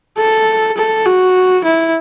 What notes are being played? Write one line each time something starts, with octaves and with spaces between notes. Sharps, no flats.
A4
A4
F#4
E4